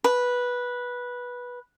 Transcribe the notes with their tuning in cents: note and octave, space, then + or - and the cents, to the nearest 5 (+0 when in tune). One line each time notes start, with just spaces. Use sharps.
B4 -10